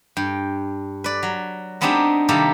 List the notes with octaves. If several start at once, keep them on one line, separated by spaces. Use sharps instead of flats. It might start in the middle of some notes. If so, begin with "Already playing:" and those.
G2 G5
B4 D5
F#3
G#3 B3 C4 D4 D#4 G4
C3 D#3 G3 A#3 G4 A4